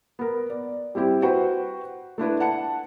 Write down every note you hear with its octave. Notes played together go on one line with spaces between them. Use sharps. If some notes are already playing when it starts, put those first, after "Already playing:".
B3 A#4
D5
G3 C4 E4 G4
F#4 B4 C5 G5
A3 D4 E4 B4
F#5 A5 C#7